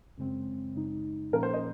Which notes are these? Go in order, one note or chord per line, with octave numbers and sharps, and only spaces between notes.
F#2 C#3 G#3 C4
F#2 C#3 G#3 D#4
A#2 F3 A#3 C#4 A#4
C5
D#5